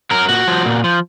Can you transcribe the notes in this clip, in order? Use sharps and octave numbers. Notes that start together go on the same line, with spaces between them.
F#3 A#4
A#2 F#4
F3
A#2
F3